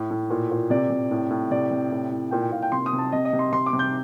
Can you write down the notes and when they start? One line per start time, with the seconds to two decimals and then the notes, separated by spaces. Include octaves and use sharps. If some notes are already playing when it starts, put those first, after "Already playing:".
Already playing: A2
0.11 A2
0.30 A#2
0.51 A#2
0.70 C3 D5
0.90 C3
1.11 A2
1.30 A2
1.51 C3 D5
1.71 C3
1.92 A2
2.11 A2
2.31 A#2 G5
2.42 G5
2.52 A#2 F5
2.62 G5
2.72 C3 C6
2.86 D#6
2.93 C3
2.98 A5
3.12 C3 D#5
3.25 D#5
3.33 C3
3.39 C6
3.52 C3 C6
3.66 D6
3.73 C3
3.79 G6